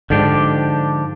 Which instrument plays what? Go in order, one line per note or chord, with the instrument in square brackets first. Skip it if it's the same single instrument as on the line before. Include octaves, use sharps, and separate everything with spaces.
[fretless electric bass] G#2 D3 [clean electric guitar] F3 D4 G4